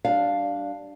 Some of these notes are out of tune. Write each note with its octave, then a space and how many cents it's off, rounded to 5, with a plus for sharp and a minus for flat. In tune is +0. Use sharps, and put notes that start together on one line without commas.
G3 -15 D4 +0 F5 +0